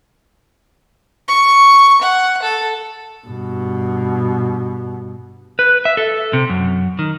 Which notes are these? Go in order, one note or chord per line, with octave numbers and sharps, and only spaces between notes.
C#6
F#5
A4
G2 B2
B4
E5
A4
C3
F#2
D#3